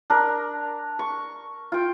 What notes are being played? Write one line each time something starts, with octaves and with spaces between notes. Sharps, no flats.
D4 A#4
C#6
F4 G5